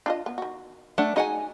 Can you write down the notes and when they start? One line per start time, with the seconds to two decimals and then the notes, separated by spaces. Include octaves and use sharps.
0.06 D4 F4 D#5
0.26 B3
0.38 D#3 F#4
0.98 A3 D4 F#5
1.16 D#4 F#4 G#4 D#5 F#5 G#5